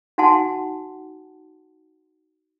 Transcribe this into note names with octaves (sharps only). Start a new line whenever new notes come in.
D#4 F#4 F#5 G#5 A5 C6